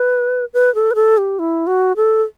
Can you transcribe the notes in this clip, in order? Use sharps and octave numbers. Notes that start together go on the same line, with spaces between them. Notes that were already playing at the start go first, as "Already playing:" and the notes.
Already playing: B4
B4
A4
B4
A4
G4
E4
F#4
A4